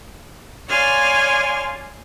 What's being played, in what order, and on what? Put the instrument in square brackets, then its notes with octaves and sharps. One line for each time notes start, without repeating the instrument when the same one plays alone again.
[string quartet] C#5 D5 F5 G#5 C6 F6